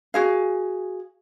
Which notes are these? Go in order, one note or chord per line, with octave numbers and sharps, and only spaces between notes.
F#4 G#4 F5